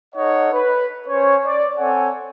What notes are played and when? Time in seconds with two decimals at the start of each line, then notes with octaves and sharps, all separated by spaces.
0.15 D#4 A4 C#5 D#5 F#5
0.53 B4
1.08 C#4 C5 C#5
1.46 D5
1.78 C4 A4 C#5 F#5 G#5